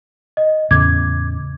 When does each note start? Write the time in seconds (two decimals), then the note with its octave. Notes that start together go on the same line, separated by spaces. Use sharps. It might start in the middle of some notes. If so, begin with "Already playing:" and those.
0.37 D#5
0.71 E2 A2 C#3 D6 G#6